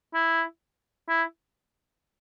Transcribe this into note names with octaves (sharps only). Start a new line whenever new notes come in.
E4
E4